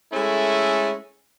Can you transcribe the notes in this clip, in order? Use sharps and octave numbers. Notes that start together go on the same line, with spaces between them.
G#3 A3 C#4 E4 A4